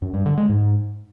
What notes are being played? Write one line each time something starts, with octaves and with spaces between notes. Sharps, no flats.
F#2
G2
D3
G#3
G#2